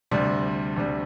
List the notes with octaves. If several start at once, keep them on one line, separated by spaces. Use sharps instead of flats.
D2 C3 G3
D2 C3 G3